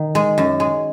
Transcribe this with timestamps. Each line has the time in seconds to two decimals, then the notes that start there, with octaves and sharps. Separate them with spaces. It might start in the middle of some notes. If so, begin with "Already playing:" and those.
Already playing: D#3
0.15 G#3
0.38 F#2
0.60 G#3